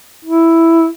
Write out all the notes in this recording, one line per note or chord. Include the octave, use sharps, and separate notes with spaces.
E4